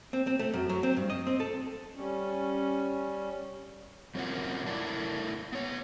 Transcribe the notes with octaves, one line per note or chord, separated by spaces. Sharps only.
C4
C4
A3
F#2
F#3
C4
G2
D#5
C4
A4
G3 C#4
F#3 C4 C#4 F4 A#4 F#5
A3 E4 A#4 D5 A5
B3 C#5